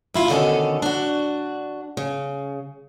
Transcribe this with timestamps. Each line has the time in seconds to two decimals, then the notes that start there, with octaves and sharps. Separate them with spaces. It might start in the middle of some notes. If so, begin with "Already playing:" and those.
0.14 D2 E4 F4
0.29 B2 D3 D#3 C#4 A4
0.82 D4 F#4
1.97 C#3